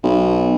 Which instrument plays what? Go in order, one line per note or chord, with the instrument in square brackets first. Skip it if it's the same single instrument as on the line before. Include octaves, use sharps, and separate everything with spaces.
[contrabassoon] B1